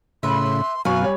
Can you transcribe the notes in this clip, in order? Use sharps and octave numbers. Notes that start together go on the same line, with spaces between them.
A2 C#3 B4 E5 C6
F#2 B2 F#3 B4 F5 G#5 C#6
G3 C#5